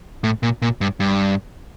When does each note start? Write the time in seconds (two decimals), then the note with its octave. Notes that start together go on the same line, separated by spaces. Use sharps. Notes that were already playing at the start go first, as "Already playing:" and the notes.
0.24 A2
0.43 A#2
0.62 A#2
0.81 G2
1.00 G2